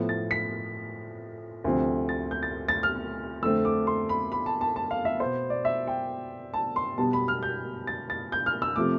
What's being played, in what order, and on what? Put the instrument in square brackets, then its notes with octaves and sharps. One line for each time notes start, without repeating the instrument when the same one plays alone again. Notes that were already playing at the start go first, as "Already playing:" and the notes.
Already playing: [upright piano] A2 F3 B3
A6
B6
D2 C3 F3 C4
A6
G6
A6
A6
F6
F2 D3 A3 C4 E6
D6
C6
B5
B5
A5
A5
A5
F5
E5
B2 B3 C5
D5
E5
G5
A5
C6
B2 G3 B3 A5
B5
F6
G6
A6
A6
G6
F6
E6
C3 F3 A3 D6